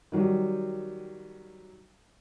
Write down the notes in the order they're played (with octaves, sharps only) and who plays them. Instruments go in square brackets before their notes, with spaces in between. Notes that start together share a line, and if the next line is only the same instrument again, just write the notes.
[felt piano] D#3 F#3 G3